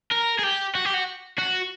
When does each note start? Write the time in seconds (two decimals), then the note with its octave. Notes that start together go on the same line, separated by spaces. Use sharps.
0.12 A#4
0.39 G#4
0.44 G4
0.75 F#4
0.85 G4
0.94 F#4
1.38 F#4